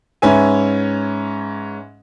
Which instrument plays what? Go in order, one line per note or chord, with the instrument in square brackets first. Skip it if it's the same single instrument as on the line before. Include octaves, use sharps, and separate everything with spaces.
[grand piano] G#2 C#4 B4 E5 G#5